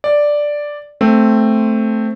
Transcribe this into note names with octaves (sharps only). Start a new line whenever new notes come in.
D5
A3 C4